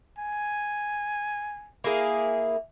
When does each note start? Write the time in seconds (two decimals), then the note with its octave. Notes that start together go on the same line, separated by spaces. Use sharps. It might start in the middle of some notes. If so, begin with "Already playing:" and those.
0.18 G#5
1.84 A#3 E4 G#4